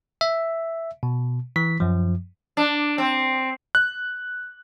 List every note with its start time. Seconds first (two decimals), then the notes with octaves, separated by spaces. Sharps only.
0.21 E5
1.03 B2
1.56 E3 B6
1.80 F#2 F3
2.57 D4
2.98 C4
3.75 F#6